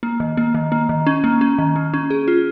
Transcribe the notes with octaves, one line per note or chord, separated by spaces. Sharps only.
A#3
D#3
A#3
D#3
A#3
D#3
C#4
A#3
C#4
D#3
A#3
C#4
G#4
F4